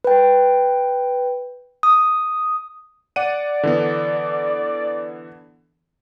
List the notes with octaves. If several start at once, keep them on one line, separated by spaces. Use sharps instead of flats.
B4 G5
D#6
D5 F#5 D#7
D3 E3 B3